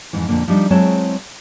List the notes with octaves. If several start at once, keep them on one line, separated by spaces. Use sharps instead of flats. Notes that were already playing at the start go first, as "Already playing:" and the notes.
F2 G#2 E3
F2 A#2 D3 A#3
F3 G3 D4 D#4
F#3 G#3 C4 E4 C#5 A5